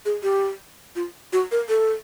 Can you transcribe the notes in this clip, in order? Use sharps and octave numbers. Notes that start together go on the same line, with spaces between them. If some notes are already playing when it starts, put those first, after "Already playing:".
G#4
G4
F4
F#4
A#4
A4